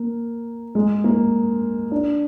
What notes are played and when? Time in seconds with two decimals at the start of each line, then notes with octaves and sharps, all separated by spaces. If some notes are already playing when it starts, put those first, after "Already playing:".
Already playing: A#3
0.75 G#3
1.04 A#3
1.92 D4